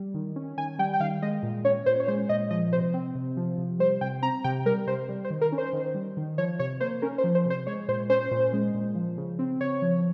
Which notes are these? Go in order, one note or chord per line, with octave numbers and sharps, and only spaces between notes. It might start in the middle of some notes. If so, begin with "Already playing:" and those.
Already playing: G3
D#3
C#4
D#3 G#5
G3 G5
G5
D#3 F5
G#3 D#5
A#2
C#4 C#5
A#2 C5
C#5
G#3 C5
A#2 D#5
F3 D#5
C3 C5
C4
C3
F3
C3
G3 C5
C3 G5
C4 A#5
C3 G5
G3 A#4
C3 C5
G3
C5
D#3
A#4
C#4
C5
D#3
G3
D#3
F3 C#5
C3 C#5
A#3 C5
C#4 A#4
C5
F3
C5
C3 C5
G#3 C#5
A#2 C5
C#4 C5
A#2
G#3
A#2
F3
C#3
C4
C#3 C#5
F3